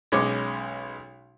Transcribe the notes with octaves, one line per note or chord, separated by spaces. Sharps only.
B1 G#3 C#4 C#5 D6